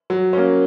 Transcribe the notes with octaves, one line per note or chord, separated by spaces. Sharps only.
F#3
A#3 C#4